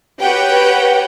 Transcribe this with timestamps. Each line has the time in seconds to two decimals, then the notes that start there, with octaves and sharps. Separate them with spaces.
0.21 F#4 G4 B4 C#5 F#5 G5